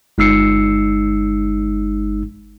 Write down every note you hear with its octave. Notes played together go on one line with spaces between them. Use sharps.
G1 G#3 D#4 E6 C7 C#7